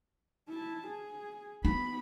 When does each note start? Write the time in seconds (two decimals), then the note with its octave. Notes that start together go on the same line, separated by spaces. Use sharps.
0.49 E4 A5
0.87 G#4
1.65 B3 D#4 B5